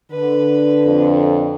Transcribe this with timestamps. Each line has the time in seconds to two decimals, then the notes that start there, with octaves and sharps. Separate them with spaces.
0.11 D3 B4
0.85 F2